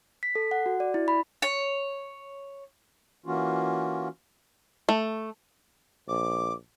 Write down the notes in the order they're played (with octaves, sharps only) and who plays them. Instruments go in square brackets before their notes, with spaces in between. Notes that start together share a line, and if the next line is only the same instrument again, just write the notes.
[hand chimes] B6
A4
F#5
F#4
D5
E4
B5
[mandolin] C#5
[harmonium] E3 A#3 C#4 F4 F#4
[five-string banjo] A3
[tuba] A#1 [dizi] D6